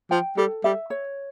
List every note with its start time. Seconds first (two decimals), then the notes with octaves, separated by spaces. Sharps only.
0.11 F3 G5
0.37 G3 A4
0.64 G3 E5
0.90 C#5